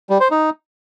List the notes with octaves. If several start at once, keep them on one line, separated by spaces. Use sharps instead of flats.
G3
C5
D#4